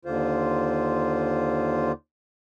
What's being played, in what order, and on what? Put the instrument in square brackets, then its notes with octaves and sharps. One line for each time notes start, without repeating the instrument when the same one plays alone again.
[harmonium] D#2 D3 F4 C5